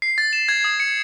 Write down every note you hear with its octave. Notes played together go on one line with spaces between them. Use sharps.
C7
A6
E7
G#6
D#6
C#7